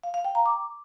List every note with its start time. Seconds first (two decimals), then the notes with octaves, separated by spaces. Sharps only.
0.03 F5
0.14 F5
0.25 G5
0.35 A#5
0.46 D6